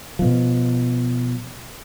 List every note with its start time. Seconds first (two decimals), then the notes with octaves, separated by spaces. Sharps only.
0.19 B2 F3